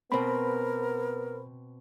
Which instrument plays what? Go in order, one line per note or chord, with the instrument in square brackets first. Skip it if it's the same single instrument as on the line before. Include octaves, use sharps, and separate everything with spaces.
[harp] B2 C4 [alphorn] B3 [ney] A#4 [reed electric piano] C5 B5